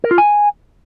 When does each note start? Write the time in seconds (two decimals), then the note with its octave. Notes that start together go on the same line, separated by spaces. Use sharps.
0.04 A#4
0.11 F4
0.18 G#5